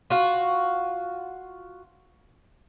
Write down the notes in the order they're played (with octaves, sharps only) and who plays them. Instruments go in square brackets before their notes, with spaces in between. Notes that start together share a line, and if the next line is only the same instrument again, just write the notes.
[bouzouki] F4 F#4